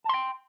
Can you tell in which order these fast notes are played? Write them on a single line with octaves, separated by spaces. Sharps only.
A5 C6 G5